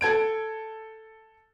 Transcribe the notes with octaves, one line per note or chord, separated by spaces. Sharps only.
A4 G#6 D7